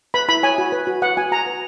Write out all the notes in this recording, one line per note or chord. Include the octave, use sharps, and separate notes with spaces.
B4 B5
E4 B5
C#5 G#5
F#4
B4
F#4
B4 F#5
F#4 G#5
F#4 A#5
B4